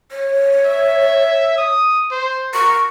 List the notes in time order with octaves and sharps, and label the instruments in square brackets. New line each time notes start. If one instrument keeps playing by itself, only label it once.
[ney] C#5
[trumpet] E5
D#6
C5
[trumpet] A#4 [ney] C#6